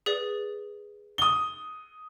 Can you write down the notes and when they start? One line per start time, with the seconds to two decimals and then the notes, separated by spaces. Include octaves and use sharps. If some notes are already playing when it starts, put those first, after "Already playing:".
0.06 G#4 B4 D5
1.18 D#6 G7